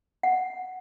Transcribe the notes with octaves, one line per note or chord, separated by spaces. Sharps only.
F#5